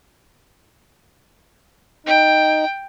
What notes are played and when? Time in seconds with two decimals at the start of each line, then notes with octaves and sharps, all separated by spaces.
2.06 D#4 G5